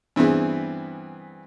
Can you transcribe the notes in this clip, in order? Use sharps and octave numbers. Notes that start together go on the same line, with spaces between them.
G2 E3 B3 C4 G#4